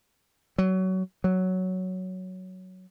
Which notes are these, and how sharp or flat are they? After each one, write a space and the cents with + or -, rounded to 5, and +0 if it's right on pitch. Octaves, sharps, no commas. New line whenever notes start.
F#3 +20
F#3 +5